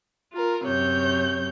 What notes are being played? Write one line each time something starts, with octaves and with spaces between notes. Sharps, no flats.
F4 A#4
F#2 C3 C#5 G6